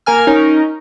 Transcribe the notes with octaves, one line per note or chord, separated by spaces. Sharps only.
A#3 A#4 G#5 F6
C#4 D#4 A#4